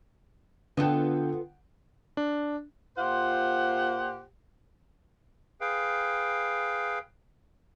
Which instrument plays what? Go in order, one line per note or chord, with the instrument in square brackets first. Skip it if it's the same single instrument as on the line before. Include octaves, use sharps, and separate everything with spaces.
[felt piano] D3 G5 [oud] B3 F4 A4
[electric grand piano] D4
[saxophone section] A#2 F4 G4 C5 F#5
[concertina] G#4 B4 F5 G5